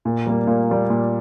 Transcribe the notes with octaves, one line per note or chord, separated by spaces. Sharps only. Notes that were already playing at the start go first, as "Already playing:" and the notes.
A#2
G3 A#3
A#2
G3 A#3
A#2